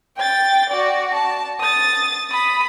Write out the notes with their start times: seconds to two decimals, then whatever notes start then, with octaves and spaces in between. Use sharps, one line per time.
0.17 G5 A6
0.70 F#4 D5
1.14 A5
1.60 D#6 A6
2.30 B5 D#6